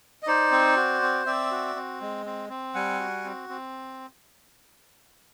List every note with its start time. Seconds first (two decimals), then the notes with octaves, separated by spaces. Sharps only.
0.23 D#5
0.27 D#4 C5 D5
0.51 C4
0.76 F#4
1.02 C4
1.26 C4 D5 E5
1.51 F#4
1.75 C4
2.01 G#3
2.26 C4
2.50 C4
2.74 G3 F#5 G#5
3.00 F#4
3.24 C4
3.49 C4